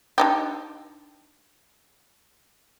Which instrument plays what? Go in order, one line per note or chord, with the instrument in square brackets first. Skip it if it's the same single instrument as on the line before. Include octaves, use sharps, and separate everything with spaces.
[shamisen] D4 D#4 G4